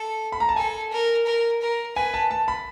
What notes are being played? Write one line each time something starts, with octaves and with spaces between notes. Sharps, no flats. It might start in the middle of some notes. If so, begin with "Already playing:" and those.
Already playing: A4
B5
A#5
A5
A4 G#5
A#4
A#4
A#4
B4 G#5
A5
A5
B5